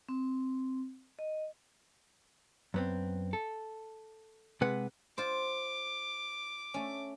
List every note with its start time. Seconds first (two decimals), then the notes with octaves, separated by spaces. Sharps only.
0.09 C4
1.19 D#5
2.74 F#2 B3 C4
3.33 A4
4.61 C3 G#3 B4 F#5
5.18 F4 C5 D6
6.74 A3 C#4